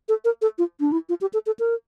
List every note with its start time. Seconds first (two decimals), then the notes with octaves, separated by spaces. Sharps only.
0.09 A4
0.25 A#4
0.42 A4
0.58 F4
0.80 D4
0.92 E4
1.09 F4
1.21 G4
1.33 A4
1.46 A4
1.59 A#4